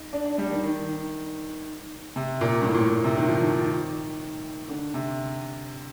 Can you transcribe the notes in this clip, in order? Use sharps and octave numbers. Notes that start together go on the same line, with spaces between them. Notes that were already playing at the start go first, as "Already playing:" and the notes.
Already playing: D#4
D4
D4
G3
D#3
D#3
C3
A#2
G2
A2
A#2
A2
A2
C3
D#3
F3
D#3
D3
C3